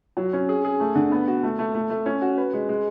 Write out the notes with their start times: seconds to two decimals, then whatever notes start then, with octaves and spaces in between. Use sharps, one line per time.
0.17 F#3
0.33 C#4
0.49 G#4
0.65 G#4
0.80 A3
0.95 D3
1.12 B3
1.28 F#4
1.43 A3
1.59 A3
1.74 A3
1.90 A3
2.06 C#4
2.22 F#4
2.38 B4
2.53 G#3
2.69 G#3